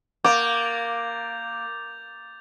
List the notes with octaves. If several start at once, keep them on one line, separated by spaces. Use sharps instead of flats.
A#3 D6 G6 A6 F7